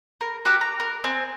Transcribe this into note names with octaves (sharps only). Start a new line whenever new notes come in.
A#4
F#4 G4 A#4 D6
A#5
A#4
C4 G#5